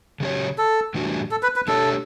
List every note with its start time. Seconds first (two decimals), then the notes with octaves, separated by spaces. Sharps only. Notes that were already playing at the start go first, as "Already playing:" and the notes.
0.20 C#3 F#3 C#4 G4 C#5
0.58 A4
0.94 A2 E3 G3 D4 F#4
1.31 A4
1.43 B4
1.56 B4
1.68 A3 D4 G4 A4 C#5